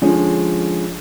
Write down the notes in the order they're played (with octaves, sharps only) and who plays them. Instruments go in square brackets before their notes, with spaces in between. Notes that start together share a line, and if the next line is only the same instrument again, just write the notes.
[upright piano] D3 F3 G#3 C#4